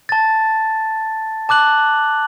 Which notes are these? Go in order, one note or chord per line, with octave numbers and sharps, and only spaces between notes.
A5 A6
A5 D6 F#6 F#7